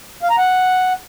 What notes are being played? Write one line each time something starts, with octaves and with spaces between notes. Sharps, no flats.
F5
A#5
F#5